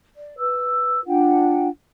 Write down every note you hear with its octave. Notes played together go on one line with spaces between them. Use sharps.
D5
B4 E6
D4 F4 F#5 G5